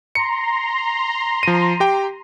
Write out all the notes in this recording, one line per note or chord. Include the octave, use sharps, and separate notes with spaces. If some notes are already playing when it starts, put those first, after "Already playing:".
A#5 C6 C#7
F3 D#7
G4 G5